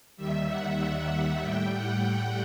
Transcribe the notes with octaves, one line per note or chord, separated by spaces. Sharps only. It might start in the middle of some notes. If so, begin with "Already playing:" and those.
D#2 D#3 G3 E5
F#5
F#5
A2 G3 G5
F#5
G5